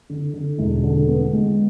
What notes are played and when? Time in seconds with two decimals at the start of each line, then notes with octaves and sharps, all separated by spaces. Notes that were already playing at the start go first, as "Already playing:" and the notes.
0.10 D3
0.34 D3
0.59 E1
0.84 D3
1.08 B3
1.33 G#3